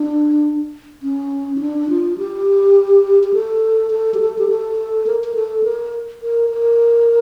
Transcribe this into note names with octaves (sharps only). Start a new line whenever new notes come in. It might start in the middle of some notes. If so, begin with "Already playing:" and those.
Already playing: D4
C#4
E4
D4
F4
G4
G4
A4
A4
G4
A4
G4
A4
A#4
A#4
A4
A#4
A#4
A#4